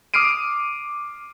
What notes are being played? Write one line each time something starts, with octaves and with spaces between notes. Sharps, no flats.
D6 D#6 F6 C7 D7 D#7